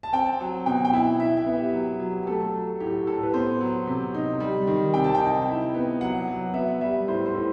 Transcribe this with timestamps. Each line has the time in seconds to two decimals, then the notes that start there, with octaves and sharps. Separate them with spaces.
0.03 A5
0.13 C4 G5
0.40 F#3
0.66 B2 G5
0.85 G5
0.93 E4
1.20 E4 E5
1.37 E5
1.46 B3
1.56 G4
1.73 F#3
2.00 F#3
2.23 G4
2.27 A3 A4
2.54 F#3
2.80 A2 G4
3.07 A2 A4
3.23 B4
3.33 B3 C5
3.61 F#3
3.87 C3
4.14 D#4
4.40 G3
4.67 D#3
4.94 C3 G5
5.04 A5
5.15 G5
5.20 D#4
5.48 E4
5.74 B3
6.01 F#3 F#5
6.28 F#3
6.54 B3 E5
6.81 G3 E5
7.08 A2 C5
7.26 C5
7.35 A2